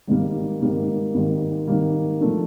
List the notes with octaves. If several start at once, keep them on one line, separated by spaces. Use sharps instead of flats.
G#1 G#2 D#3 G3 A#3
G#1 G#2 D#3 G3 A#3
G#1 G#2 D#3 G3 A#3
G#1 G#2 D#3 G3 A#3
F3 A3 D4